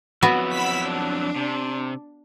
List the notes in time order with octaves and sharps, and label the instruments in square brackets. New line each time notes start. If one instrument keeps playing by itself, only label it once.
[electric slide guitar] F2 F#3 E4 [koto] B3 F#4
[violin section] B5 E6 B6
D4
[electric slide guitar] C3